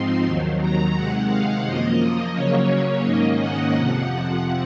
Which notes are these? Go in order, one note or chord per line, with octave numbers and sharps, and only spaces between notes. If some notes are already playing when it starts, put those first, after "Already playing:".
Already playing: G#2 F3 C4 D#4 C6
D#2 D#3 F#3
A#5
C3 D#3 G#3 F#5
F5
F#2 F3 A#3 D#5
C#3 F#3 A#3 C#4 C#5
G#2 D#3 A#3 C#4 D#5
F#5
F2 C3 F3
F#5